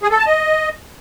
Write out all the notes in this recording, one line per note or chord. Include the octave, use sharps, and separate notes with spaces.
G#4
A4
A5
D#5